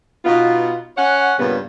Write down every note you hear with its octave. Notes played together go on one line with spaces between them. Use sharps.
B2 B3 D#4 F4
C#4 C#5 F#5
G2 A#2 C#3 G3 B3